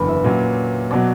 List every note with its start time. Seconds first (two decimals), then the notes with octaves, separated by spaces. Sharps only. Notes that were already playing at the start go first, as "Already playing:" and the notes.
Already playing: F#1 E2 D3 B4 D5
0.08 E5
0.24 A#2 F#3 C#4 E5
0.91 B2 F#3 B3 D5